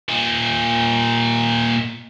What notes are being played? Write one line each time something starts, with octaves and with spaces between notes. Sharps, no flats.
A#2 D#4